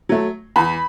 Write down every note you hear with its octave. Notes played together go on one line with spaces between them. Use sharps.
F#3 A3
E2 B5